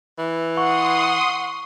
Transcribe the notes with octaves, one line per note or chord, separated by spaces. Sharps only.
E3
F#5 C6 C#6 D#6